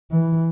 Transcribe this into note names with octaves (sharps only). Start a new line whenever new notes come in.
E3